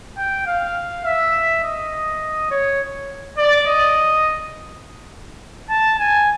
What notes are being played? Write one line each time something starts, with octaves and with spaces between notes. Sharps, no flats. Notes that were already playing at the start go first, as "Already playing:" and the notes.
G5
F5
E5
D#5
C#5
D5
D#5
A5
G#5